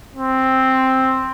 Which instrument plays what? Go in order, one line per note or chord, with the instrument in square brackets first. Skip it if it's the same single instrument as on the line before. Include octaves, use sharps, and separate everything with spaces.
[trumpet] C4